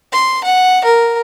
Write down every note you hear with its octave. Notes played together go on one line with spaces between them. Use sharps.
C6
F#5
A#4